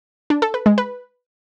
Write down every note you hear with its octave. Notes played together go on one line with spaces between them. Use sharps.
D4
A4
B4
G#3
B4